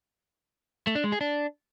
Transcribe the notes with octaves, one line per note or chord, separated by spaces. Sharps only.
A3
D4
G#3
G#4
D4